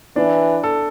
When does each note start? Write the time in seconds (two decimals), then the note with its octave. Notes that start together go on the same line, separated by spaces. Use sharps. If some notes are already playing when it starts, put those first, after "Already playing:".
0.16 E3 D4
0.64 A4